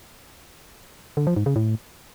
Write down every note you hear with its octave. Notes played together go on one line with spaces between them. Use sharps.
D3
F3
G#2
C#3
A2